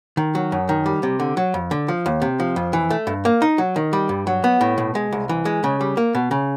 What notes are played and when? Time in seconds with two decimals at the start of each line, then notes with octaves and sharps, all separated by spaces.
0.17 D#3
0.35 F#3
0.52 F#2
0.69 D#3
0.86 G3
1.03 C3
1.20 D3
1.37 F#3
1.54 F2
1.71 D3
1.88 F3
2.06 D#2
2.22 C3
2.40 F3
2.56 F2
2.73 E3
2.90 A3
3.07 G2
3.25 A#3
3.42 D#4
3.58 F#3
3.76 D#3
3.93 G3
4.09 G2
4.27 F#3
4.44 B3
4.61 A2
4.78 B2
4.95 G#3
5.13 C2
5.29 E3
5.45 G#3
5.64 C#3
5.81 G3
5.97 A#3
6.15 B2
6.31 C#3